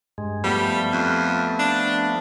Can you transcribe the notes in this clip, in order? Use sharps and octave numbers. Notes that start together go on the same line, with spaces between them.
G2 G#3
F3 G3 A3 B3
F2
D4